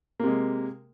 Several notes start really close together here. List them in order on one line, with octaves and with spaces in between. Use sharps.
A#3 C3 G#3